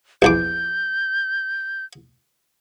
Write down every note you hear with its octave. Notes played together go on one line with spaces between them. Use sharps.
A#1 E2 D6 G6